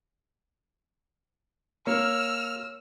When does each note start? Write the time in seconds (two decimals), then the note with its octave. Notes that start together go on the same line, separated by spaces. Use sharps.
1.87 A#3 C#5 E6 F6